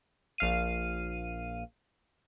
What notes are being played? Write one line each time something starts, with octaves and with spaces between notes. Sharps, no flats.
A#1 F5 D#7